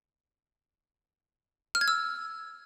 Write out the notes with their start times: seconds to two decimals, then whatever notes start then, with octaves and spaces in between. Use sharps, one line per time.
1.75 F6
1.81 G#6
1.88 E6